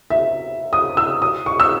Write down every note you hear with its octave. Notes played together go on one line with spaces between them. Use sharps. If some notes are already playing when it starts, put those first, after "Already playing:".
E5
D#6
E6
D#6
C#6
E6